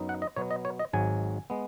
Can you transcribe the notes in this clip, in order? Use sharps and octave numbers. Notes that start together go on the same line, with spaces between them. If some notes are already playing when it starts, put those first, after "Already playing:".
Already playing: F#2 F#3 B3 D#4
F#5
D#5
B2 F#3 B3 C#5
D#5
C#5
D#5
G#1 G#2 F#3 G#5
G#3 B3